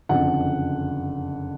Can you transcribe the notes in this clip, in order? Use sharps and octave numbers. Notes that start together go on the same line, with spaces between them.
F#1 F2 D3 F#5